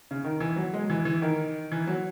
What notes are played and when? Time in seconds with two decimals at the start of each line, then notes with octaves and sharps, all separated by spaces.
0.11 C#3
0.24 D#3
0.40 E3
0.56 F#3
0.73 G#3
0.90 E3
1.05 E3
1.22 D#3
1.72 E3
1.87 F#3